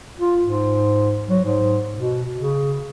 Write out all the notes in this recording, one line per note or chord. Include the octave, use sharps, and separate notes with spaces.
F4
G#2
F#3
G#2
B2
C#3